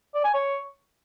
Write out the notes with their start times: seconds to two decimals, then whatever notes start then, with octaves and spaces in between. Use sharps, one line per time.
0.15 D5
0.24 G#5
0.34 C#5